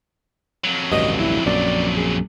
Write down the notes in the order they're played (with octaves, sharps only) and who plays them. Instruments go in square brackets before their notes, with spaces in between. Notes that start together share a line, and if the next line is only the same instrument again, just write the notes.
[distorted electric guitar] F2 F#3
[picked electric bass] A1 D2 G2 [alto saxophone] D#5
[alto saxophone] E4
[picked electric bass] A#1 F#2 [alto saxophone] D5
[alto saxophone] G#4